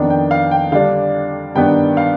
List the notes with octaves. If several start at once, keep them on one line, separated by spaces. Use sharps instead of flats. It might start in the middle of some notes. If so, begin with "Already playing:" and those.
Already playing: F2 D#3 B3 D4
G5
F5
G5
D3 G3 D4 F5
G2 D#3 B3 D4 G5
F5